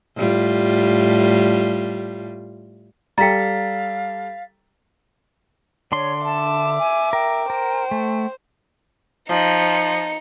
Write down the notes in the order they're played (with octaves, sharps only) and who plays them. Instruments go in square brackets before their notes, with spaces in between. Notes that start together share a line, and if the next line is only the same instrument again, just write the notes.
[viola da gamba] A2 G3 F4
[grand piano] G3 A4 [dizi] F5 [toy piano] G5 A#5 [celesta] A6 B6
[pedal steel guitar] D3 D4 C6 [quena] C#5
[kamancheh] E5 D6 [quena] A5
[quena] G#5
[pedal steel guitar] A#4 [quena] G5
[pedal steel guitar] A#4 [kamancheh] C5
[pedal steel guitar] A3
[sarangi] F3 [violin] D#4 C#7